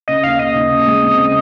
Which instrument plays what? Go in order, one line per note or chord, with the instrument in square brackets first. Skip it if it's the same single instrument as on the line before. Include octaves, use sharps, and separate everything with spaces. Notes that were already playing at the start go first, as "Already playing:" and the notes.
[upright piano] C#3 [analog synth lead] D#5
[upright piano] D#2 [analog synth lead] F5
[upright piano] C#3 [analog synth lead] D#5
[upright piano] D#2
C#3
G#3
C4
C#3